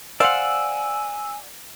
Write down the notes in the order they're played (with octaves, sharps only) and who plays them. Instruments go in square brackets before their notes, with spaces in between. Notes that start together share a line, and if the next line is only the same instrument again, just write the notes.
[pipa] C5 F5 [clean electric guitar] D5 F#5 [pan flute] G#5 [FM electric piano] E6